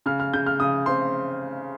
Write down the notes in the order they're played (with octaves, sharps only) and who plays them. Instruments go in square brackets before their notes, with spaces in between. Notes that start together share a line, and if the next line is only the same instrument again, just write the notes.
[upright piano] C#3 F6
F6
C#3 G6
F6
C#3 D#6
C4 C6